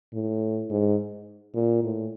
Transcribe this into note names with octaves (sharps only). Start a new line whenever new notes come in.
A2
G#2
A#2
A2